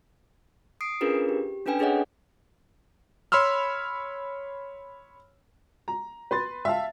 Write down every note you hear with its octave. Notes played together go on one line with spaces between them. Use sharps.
D#6 C7 D7
C#4 D4 F4 G#4 A#4 B4
G4
C#4 D4 A4 B4 G5 G#5
D4 G#4 A4 C#5 D#5 F#5
C#5 B5 C6 E6 F6
A#5
B4 C6 A6
E5 F5 A5